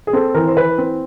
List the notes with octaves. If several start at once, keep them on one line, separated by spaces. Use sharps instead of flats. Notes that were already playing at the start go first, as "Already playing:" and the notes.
G#4
C4 A4
E3 A#4
C5
E3 B4
C4